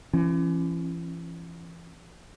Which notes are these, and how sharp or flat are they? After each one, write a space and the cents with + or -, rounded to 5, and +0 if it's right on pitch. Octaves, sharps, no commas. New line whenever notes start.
E3 +40 C#4 -25